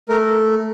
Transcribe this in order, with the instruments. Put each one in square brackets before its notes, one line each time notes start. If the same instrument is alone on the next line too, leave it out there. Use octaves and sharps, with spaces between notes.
[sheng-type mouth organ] A3 A#4